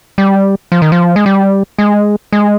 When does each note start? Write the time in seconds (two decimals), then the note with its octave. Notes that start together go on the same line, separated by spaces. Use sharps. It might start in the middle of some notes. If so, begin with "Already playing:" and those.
0.18 G3
0.72 F3
0.82 D#3
0.92 F3
1.16 G#3
1.26 G3
1.78 G#3
2.32 G#3